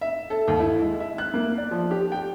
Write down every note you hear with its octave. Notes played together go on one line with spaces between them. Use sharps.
E5
A4
D#2
E4
G#3
E5
F#6
A#3
D5
F3
G4
G5